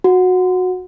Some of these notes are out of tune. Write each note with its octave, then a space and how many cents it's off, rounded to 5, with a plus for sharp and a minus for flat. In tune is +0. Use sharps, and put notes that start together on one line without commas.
F#4 -15